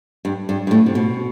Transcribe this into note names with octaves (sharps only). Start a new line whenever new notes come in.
G2
G2
G2
A2
C3
B2